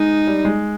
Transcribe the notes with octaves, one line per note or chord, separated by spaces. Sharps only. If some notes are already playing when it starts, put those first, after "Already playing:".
Already playing: G#3 D#4
G3
G#3